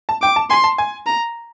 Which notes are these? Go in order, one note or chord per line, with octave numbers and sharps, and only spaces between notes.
A5
G5 D6
A5
G#5 C6
A5
G#5
A#5